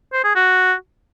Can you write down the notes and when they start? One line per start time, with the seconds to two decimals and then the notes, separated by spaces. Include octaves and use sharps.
0.13 C5
0.24 G#4
0.35 F#4